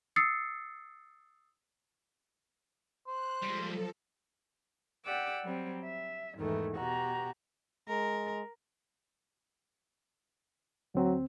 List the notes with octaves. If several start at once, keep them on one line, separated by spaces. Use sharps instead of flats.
D#6 E6 A6 C7 C#7
C5 F#6
F3 G3 G#3 A4
G4 D5 F#5 D6 E6
F#3 G3 C4
E5
E2 G#2 D#3 E3 A3
B2 F#4 G4 A#5
G#3 A#4
D2 F#3 C4